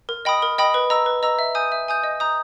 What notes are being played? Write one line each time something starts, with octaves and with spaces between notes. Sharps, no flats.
A#4
D#5 G5 B5 D#6
A#4
D#5 G5 B5 D#6
B4
D#5 A#5 E6
B4
D#5 A#5 E6
E5
G#5 D#6 G6
E5
G#5 D#6 G6
D#5
A#5 D#6 G6